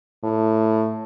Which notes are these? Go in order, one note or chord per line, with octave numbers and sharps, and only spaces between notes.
A2